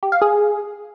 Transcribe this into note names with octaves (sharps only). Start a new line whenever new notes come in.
G4
F5
G#4